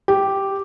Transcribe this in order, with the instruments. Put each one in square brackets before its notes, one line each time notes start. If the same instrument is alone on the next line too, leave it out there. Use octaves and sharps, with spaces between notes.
[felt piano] G4